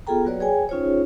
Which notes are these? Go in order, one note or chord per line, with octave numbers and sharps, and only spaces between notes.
B3 F4 G#4 A4 G5 A#5
F#3 A#3 F#4 B4 C#5 D5
G#4 C#5 G5 G#5
C#4 D#4 F4 G#4 C5 C#5